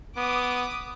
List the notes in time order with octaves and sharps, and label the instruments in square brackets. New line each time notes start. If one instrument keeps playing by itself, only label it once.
[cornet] B3 [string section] D6 D#6